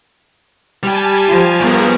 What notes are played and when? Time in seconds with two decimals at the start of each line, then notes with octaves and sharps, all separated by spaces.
0.83 G3 G4 G#5 A5
1.29 F3
1.61 E2 G2 B3 G#4 A#4